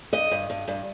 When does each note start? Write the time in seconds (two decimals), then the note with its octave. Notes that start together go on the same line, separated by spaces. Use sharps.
0.13 G2 D#5
0.31 G2
0.50 G2
0.68 G2